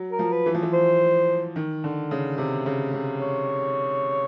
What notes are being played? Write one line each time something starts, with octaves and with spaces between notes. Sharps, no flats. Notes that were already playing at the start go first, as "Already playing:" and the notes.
Already playing: F#3
A#4
F3
B4
E3
F3
E3
C5
D#3
D3
C#3
C3
C#3
C3
C#5